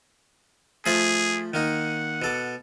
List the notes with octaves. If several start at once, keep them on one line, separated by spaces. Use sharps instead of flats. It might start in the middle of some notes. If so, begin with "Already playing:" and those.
F3 A3 G#4 B5
D#3 A#3 D#4 F#5
B2 A4 D6